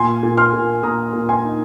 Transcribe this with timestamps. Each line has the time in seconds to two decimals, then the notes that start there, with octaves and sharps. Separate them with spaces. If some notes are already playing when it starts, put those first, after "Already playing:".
Already playing: A#2 G#5 C6
0.23 A#2
0.37 C6 F6
0.53 A#2
0.83 A#2 A#5 D#6
1.13 A#2
1.29 G#5 C6
1.44 D#4